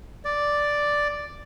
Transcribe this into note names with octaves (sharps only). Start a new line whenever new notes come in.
D5